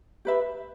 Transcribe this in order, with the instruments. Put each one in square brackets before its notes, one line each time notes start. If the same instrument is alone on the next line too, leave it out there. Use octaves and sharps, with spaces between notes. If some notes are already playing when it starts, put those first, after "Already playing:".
[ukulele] G4 B4 E5